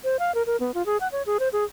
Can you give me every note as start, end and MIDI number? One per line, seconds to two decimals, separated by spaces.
0.04 0.19 72
0.19 0.34 77
0.35 0.43 70
0.47 0.57 70
0.60 0.74 59
0.74 0.85 65
0.86 0.97 68
1.01 1.08 78
1.12 1.22 73
1.26 1.37 68
1.40 1.49 72
1.53 1.64 68